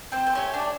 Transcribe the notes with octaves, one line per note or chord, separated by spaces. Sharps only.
C4 C5
C5
A3 C#4 G4 C#5
D4 D5